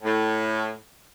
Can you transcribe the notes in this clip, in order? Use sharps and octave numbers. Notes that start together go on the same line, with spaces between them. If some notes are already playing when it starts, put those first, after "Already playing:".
A2